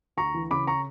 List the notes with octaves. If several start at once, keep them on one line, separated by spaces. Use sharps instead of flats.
D2 A#5 C#6
E3
C#3 B5 D6
A#5 C#6